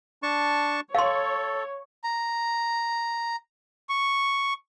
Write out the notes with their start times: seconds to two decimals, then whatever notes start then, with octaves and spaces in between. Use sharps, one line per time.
0.23 D4 A5 C#6
0.95 A4 C#5 F5 C6
2.04 A#5
3.89 C#6